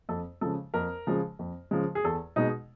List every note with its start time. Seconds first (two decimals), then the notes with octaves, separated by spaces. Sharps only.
0.09 F2 A4
0.41 C#3 F3 G#3 A4
0.74 F2 A#4
1.07 C#3 F3 G#3
1.39 F2
1.71 C#3 F3 G#3
1.95 G#4
2.04 E2 A4
2.36 B2 G#3 D#4